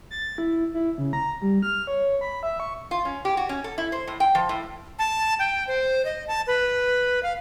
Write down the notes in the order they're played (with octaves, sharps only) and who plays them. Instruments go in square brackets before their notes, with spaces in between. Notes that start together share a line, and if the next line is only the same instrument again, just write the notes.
[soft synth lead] A6
E4
E4
C#3
A#5
G3
F6
C#5
B5
E5
C#6
[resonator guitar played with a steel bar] F4
C#4
G4
F#4
C#4
A4
E4
C5
A2
G5
F3
A2
[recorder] A5
G5
C5
D#5
A5
B4
F5